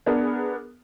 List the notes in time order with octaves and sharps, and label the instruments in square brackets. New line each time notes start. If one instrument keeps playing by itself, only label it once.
[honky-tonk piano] B3 D4 G#4 A#4